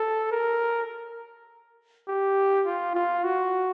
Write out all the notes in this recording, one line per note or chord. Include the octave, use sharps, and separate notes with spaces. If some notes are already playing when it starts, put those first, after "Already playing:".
Already playing: A4
A#4
G4
F4
F4
F#4